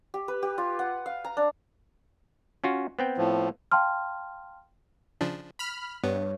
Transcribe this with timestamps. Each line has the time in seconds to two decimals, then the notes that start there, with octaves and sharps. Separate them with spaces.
0.14 G4
0.28 B4
0.43 G4
0.58 F4
0.79 F#5
1.06 F5
1.25 A#5
1.37 D4
2.64 C#4 F4 F#4
2.99 B3 C4 G5
3.18 A2 F3
3.72 F5 G5 A5 C6 F6
5.21 C#3 F3 D4
5.59 B5 F6
6.04 G2 B3 C#5